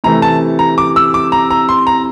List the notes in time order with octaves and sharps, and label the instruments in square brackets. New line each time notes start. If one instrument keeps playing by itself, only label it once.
[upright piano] C3 E3 A3 [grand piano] A#5
[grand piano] A5
A#5
D6
E6
D6
A#5
A#5
C6
A#5